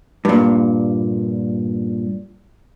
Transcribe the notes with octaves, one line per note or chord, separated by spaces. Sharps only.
G2 A#2